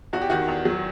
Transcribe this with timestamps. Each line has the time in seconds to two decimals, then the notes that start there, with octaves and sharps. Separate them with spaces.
0.13 E2 F#4
0.21 G4
0.30 D#3 F#4
0.48 E2
0.65 F#3